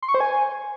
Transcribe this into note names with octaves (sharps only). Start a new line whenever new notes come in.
C6
C#6
C5
G#5